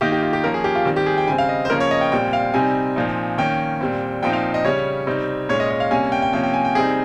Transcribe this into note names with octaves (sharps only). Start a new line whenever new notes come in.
D#3 A#3 D#4 G4
G4
F4
G4
F3 A#3 C#4 A#4
G#4
G4
F4
D#3 G3 C4
G4
G#4
G5
C#3 G3 C4 G#5
F5
D#5
C5
C#3 F3 A#3 C#4 A#4
C#5
D#5
G5
A#2 G3 C4 G5
F5
C3 G3 C4 D#4 G#5
A#2 F3 C4 D#4
D#3 A#3 C#4 G5
A#2 G3 C4
A#2 F3 C4 D#4 G5
F5
D#5
C#3 G3 C#4 C#5
C3 G3 C4 D#4
A#2 G#3 C#4 C#5
D#5
D#5
F5
C3 G3 A#3 C#4 G#5
G5
G5
C3 F3 A#3 C#4 G5
G5
G#5
G5
C3 G3 C4 D#4 G#4